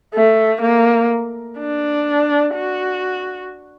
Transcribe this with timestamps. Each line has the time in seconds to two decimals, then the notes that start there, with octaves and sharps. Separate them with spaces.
0.14 A3
0.61 A#3
1.58 D4
2.54 F#4